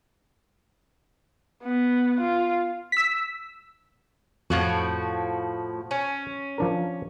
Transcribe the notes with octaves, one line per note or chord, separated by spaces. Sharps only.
B3
F4
E6 B6
F2 A2 F3 F#4
C#4
F3 D4 A#4